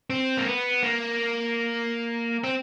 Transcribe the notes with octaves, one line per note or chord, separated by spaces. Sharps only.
C4
A#3
B3
A#3
C4